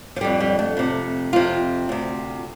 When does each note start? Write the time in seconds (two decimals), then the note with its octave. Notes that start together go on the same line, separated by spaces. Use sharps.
0.16 F3
0.21 F2 D3 G3
0.40 G3
0.59 A3
0.77 F2 C3
1.33 F2 C3 F4
1.89 D2 C3